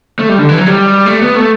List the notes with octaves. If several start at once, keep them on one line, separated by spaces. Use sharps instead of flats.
A3
G3
D3
E3
F#3
G3
A3
B3
A3